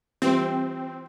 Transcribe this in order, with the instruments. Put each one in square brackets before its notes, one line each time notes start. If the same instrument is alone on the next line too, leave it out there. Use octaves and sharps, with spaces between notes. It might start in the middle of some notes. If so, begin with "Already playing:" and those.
[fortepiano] E3 G3 F4 [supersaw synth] C4